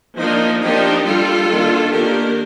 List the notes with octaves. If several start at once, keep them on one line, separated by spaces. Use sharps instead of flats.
F3 A#3 D4 D#4
F3 A#3 D4 D#4 G4
G3 D4 F4 A4
D#3 A#3 D4
D#3 A#3 D4 G4 A#4